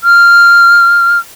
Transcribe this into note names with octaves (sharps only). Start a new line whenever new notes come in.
F6